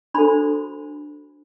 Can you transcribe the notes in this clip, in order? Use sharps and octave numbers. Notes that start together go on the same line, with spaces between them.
D4 F#4 A4 C5 B5